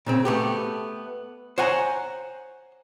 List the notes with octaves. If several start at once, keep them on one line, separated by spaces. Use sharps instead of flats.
A#2 C#3 C4
A3 B3 G4
C5 C#5 F#5 G#5 A#5